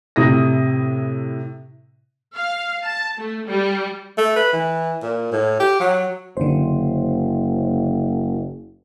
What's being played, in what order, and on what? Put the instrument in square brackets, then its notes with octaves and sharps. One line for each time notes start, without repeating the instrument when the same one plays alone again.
[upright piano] A2 C3 E4 D#6 A#6
[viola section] F5
A5
A3
G3
[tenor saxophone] A3
B4
E3
A#2
A2
G4
F#3
[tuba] F#1 [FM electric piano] D3 C5